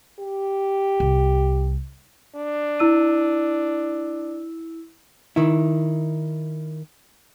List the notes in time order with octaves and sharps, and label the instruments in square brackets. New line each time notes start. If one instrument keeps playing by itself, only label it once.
[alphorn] G4
[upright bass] C2
[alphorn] D4
[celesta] E4 E6 D#7
[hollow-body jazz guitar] D#3 E4